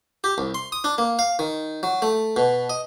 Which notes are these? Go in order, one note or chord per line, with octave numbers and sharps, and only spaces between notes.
G4
C2
C6
D#6
D4
A#3
F5
D#3
F#3
A3
B2
D#5